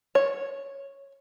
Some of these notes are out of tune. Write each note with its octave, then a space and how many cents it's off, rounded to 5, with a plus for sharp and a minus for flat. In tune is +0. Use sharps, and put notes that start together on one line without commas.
C#5 -5